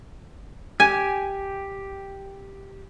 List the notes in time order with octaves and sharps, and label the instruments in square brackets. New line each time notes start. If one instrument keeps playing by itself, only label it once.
[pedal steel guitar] G4 [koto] G#5